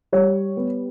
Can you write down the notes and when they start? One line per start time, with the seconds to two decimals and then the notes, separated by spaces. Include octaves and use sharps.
0.12 G3 C#5
0.57 B3